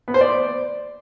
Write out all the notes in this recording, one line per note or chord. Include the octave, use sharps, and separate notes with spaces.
B3
C5
D5